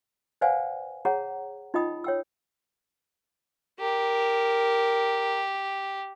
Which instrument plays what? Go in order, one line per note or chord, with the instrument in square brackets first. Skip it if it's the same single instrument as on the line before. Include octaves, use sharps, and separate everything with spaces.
[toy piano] B4 C5 D5 F5 F#5 G#5
G#4 C#5 F#5 A#5
D#4 F4 D#5 G5 B5 D#6
C#5 G5 E6
[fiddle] G4 [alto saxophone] A#4